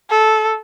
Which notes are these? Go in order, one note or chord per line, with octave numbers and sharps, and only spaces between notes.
A4